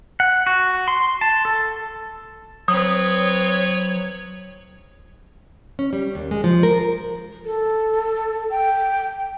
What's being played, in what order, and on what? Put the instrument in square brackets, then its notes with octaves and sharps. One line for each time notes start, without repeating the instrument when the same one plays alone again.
[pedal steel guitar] F#5
F#4
C6
A5
A4
[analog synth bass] F#3 [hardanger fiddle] C4 B4 [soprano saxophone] C#5 [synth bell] D#6
[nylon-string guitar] C#4
G3
D#2
G#3
F3
A#4
[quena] A4
G5